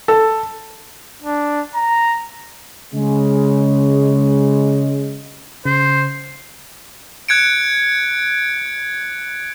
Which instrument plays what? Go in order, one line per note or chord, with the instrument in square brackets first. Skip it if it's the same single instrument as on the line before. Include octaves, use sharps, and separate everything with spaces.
[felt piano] A4
[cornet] D4
A#5
[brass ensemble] C#3 G#3
[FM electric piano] C#3 [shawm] C5
[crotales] F#6 G#6 C#7 D7